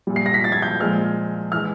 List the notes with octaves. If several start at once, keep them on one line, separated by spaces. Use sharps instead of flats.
A#2 G3
C7
A#6
B6
A6
G#6
G6
A#2 F3 G#3 F6
E3 G#3 F6